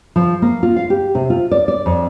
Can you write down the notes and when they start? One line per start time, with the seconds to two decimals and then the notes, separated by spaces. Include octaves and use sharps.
0.16 F3
0.42 A#3
0.63 F4
0.76 F5
0.90 G4
1.15 C3
1.30 F4
1.51 D5
1.68 D5
1.86 F2